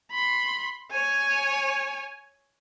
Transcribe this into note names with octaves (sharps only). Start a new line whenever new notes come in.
B5 C6
C#5 G#5